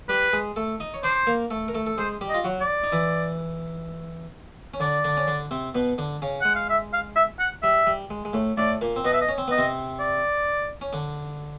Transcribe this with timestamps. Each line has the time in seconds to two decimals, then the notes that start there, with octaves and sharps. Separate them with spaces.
0.09 G3 G4 B4
0.33 G#3 G#4
0.56 A3 A4
0.80 D#4 D#5
0.94 C#5
1.03 D4 C5 D5
1.27 A#3 A#4
1.51 A3 A4
1.68 A#4
1.74 A3 A4
1.87 A4
1.98 G#3 G#4 C5
2.21 G3 G4
2.29 D#5
2.34 F4
2.44 F#3 F#4
2.61 D5
2.84 D#4
2.92 E3 E4
4.74 C#4
4.80 D3 D4 D5
5.04 D3 D4
5.17 C#4
5.27 D3 D4
5.51 C3 C4
5.75 B2 B3
5.98 D3 D4
6.22 C#3 C#4
6.41 G#3 F#5
6.55 F5
6.70 E5
6.93 F5
7.16 E5
7.40 F#5
7.63 G3 E5
7.87 G3
8.10 G#3
8.25 G#3
8.33 A2 A3
8.58 A2 A3 D5
8.81 A#2 A#3
8.96 C4
9.04 B2 B3 D#5
9.13 E5
9.21 D#5
9.29 C#4
9.38 C4
9.48 B3 D#5
9.58 C3 C4
9.99 D5
10.81 C#4
10.93 D3 D4